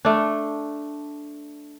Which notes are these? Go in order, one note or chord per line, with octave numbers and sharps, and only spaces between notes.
A3 D4